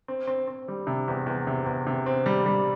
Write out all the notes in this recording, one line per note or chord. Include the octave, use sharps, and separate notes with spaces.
C4
C4
C4
G3
C3
E2
E2
C3
E2
C3
C4
G3
G3